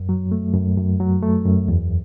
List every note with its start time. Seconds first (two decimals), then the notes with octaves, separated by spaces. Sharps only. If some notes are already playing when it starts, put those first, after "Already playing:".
Already playing: F#2
0.09 F#3
0.32 A3
0.54 F#2
0.77 F#2
1.00 F#3
1.22 A3
1.46 F#2
1.68 E2